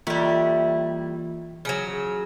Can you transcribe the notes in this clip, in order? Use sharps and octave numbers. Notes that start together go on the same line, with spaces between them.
E3 G3 A#3 E4 F4
C#3 F#3 G#5 F6